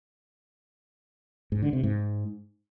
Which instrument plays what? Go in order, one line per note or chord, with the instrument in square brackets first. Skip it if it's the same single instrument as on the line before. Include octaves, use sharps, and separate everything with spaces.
[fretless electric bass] G#2
D3
C3
G#2